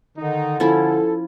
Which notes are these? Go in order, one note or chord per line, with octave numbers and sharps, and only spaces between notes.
D3 D#3 D#4
F3 C#4 E4 A4